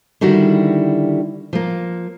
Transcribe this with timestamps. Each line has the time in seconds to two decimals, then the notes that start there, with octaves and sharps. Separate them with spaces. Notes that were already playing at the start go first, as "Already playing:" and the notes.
0.21 D3 D#3 G3 E4 F#4
1.53 F3 A#3